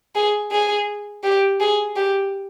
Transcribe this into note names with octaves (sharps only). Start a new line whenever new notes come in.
G#4
G#4
G4
G#4
G4